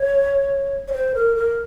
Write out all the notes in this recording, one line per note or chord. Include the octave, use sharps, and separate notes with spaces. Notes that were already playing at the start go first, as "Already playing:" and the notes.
Already playing: C#5
C#5
C5
A#4
A#4